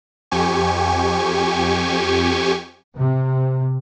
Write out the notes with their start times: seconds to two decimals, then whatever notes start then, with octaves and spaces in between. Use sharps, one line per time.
0.31 F2 G4 G#5 C#6
2.96 C3